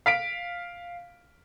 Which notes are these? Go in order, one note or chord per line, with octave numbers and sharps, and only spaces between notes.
F5 B6 D7